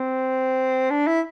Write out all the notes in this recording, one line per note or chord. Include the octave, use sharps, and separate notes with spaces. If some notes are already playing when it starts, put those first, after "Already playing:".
Already playing: C4
D4
E4